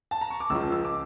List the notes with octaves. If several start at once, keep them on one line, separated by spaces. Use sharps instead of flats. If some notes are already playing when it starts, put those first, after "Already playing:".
A5
A#5
C#6
D6
C#2 C#3 F3 E6
E6
D6